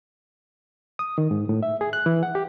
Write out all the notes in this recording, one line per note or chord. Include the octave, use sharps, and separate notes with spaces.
D#6
D#3
G#2
A2
E5
G#4
F#6
E3
F#5
G4